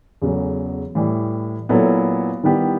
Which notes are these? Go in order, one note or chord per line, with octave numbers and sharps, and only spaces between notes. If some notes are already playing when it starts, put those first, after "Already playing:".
E2 C#3 F#3 A3
A2 E3 G3
A#2 F#3 B3 E4 A4
D#3 G3 B3 E4 G4